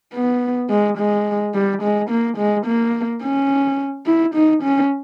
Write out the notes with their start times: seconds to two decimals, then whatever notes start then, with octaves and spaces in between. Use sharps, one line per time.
0.14 B3
0.70 G#3
0.98 G#3
1.54 G3
1.82 G#3
2.10 A#3
2.38 G#3
2.66 A#3
3.22 C#4
4.06 E4
4.34 D#4
4.63 C#4